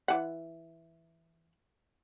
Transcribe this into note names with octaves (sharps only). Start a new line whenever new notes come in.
E3 F#5